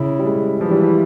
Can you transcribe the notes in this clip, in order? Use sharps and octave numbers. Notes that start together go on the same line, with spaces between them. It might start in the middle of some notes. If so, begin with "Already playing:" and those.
Already playing: C#3 E4
G3
G#3
E3 F3
G3
F3